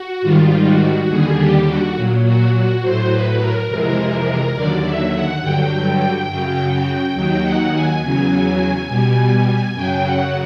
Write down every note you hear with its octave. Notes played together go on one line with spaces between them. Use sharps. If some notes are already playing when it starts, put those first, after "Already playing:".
Already playing: F#4
G#2 D#3 G3 F4
F#4
D#2 D3 G3 G#4
G4
F#4
A#2 F#3
F#4
F#4
A2 F#3 C5
B4
A#4
F2 C3 E3 G#3
D#2 D3 F#3 D5
E5
F#5
G2 D3 F#3 G5
F#2 C#3 F#3
D#2 D#3 F#3 G5
F#5
G#5
E2 C#3 F#3 G#5
B2 G3
F#2 C#3 F#3 G5
F#5